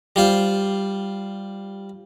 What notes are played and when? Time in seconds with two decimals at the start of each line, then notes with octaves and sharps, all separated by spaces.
0.16 G3 F4 C5